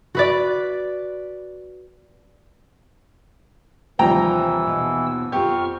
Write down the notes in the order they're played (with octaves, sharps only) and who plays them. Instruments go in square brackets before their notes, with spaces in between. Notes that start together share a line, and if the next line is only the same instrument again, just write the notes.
[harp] F#4 B4 D5
[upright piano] D#2 F3 [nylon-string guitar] C3 G3 [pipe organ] E3 E6 [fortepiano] G5 A#5
[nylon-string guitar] B2
[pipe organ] F2 C#6 F6 [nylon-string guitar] B3 F4 [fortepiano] G4